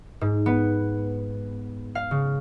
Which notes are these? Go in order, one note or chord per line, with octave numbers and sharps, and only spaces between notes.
G#2
B3
F5
C#3